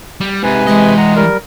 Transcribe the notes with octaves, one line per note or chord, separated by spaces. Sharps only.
G3
G#2 C3 B4 G#5
E3 G#3 D#5
F#5 A#5
G3 A#4